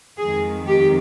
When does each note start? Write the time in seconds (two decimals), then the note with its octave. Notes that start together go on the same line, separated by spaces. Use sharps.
0.18 F2 D#3 G#3 G#4
0.66 G4